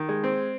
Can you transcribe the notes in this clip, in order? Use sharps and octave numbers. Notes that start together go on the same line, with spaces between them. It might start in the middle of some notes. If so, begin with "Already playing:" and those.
Already playing: D#3
G#3
C4